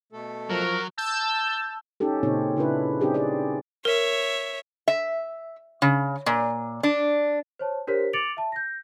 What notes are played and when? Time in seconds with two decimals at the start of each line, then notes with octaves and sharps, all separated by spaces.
0.12 B2 A3 A4
0.50 F3 F#3 A#4
0.98 A5 E6 G6
2.00 C#4 D#4 G4 A4
2.23 A#2 C#3 C4 D#4 C#5
2.56 C#3 D4 E4 B4
3.01 C4 C#4 D#4 G4 G#4
3.14 G4 G#4 D5
3.85 A#4 C#5 E5
4.88 E5
5.82 C#3
6.26 A#2
6.83 D4
7.59 C5 C#5 A5
7.87 D4 G4 A#4 C5 C#5 B6
8.13 D6 A6 C#7 D7 F7 F#7
8.37 E5 A5
8.52 G6 A#6